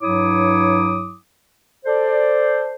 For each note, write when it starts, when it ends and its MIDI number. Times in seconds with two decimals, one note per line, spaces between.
0.02 1.14 43
0.02 1.14 54
0.02 1.14 64
0.02 1.14 73
0.02 1.14 86
0.02 1.14 87
1.86 2.74 69
1.86 2.74 72
1.86 2.74 74